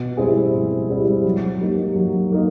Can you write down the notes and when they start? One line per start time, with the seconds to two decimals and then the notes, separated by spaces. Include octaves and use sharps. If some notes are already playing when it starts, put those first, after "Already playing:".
Already playing: B2
0.17 G3 C4 E4 G#4
0.54 B2
0.89 G3 C4 E4 G#4
1.24 F#3
1.61 A#3 D#4 G4
1.96 F#3
2.32 A#3 D#4